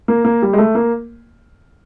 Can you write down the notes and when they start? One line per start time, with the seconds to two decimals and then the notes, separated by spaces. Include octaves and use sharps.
0.08 A#3
0.25 A#3
0.42 G3
0.53 G#3
0.58 A3
0.75 A#3